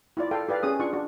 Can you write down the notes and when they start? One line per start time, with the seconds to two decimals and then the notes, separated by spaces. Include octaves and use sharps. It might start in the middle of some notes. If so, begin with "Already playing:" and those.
0.17 E4 F4 D5
0.31 A4 F5 G5
0.49 G4 B4 D5 F5
0.63 C#4 G#4 D#6
0.80 D4 F4 C#6
0.93 D4 F#4